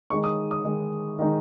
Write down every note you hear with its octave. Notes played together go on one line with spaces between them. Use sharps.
D#3 G#3 D#4 C#6
D#6
D#6
D#3 G#3 D#4
D#3 G#3 D#4